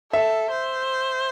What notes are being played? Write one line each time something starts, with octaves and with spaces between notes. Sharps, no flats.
A4 E5
C5